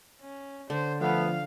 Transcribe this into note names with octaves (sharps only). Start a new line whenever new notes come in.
C#4
D3 C5
F3 A3 B3 F5